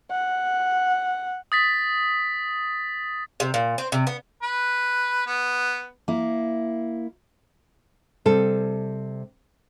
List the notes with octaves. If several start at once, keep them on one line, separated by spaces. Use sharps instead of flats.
F#5
D#6 A6 B6
C3
A#2
C4
C3
B3
B4
B3
A#3 E4
C3 G3 A4